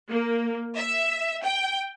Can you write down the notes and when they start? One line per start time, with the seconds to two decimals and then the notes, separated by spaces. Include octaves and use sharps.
0.10 A#3
0.76 E5
1.43 G5